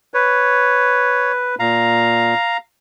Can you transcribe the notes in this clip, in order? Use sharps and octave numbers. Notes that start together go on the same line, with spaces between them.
B4 C#5
A#2 F5 A#5